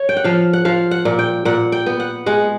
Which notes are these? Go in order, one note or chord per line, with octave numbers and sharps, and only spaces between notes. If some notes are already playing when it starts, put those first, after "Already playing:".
Already playing: C#5
G5
F#5
F3 F5
F#5
F3 F5
F#5
A#2
G5
A#2 F#5
G5
B3
F#5
G#3 F#5